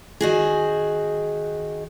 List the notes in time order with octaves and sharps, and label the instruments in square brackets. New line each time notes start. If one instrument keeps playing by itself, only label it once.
[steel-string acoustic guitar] D#3 F#4 G#4